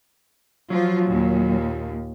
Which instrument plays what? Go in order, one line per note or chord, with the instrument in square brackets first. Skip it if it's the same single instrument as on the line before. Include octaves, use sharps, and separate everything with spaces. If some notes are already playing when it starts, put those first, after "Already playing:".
[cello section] F3 F4 [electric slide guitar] F#3
[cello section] D#2 A#2